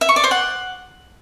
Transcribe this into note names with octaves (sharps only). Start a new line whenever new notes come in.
E5
C#6
D5
C5
F#5